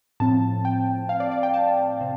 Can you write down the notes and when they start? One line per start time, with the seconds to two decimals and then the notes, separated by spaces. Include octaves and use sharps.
0.20 A2 F3 C4 A5
0.65 G5
1.09 F5
1.20 D5
1.31 D5
1.43 G5
1.54 A5
2.01 C3